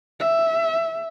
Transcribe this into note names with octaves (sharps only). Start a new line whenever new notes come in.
E5